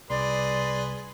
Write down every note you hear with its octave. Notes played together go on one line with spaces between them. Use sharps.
C2 G#4 B4 D5 C6